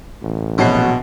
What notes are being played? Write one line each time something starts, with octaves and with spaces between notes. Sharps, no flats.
A1
A#1 B2 F#3 F#4 F#5 C7